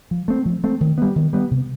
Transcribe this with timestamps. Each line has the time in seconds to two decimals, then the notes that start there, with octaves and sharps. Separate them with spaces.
0.11 F3
0.28 A3 C4
0.45 F3
0.64 A3 C4
0.81 D#3
0.98 G3 B3
1.16 D#3
1.33 G3 B3
1.51 C3